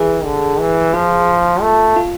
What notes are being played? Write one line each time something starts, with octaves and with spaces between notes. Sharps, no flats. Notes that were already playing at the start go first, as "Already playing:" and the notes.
Already playing: E3 G#4
D3
E3
F3 F4
A3
F4